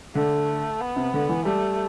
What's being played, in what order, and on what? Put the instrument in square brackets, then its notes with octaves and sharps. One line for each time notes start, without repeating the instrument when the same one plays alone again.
[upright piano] D3 [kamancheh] A3
[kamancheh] B3
[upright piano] C3
D3
E3
[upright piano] G3 [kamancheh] A3